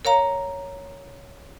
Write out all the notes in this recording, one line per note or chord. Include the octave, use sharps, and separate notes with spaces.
A#4 C#5 F5 A#5